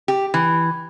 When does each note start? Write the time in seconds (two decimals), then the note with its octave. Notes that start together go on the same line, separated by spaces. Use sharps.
0.08 G4
0.34 E3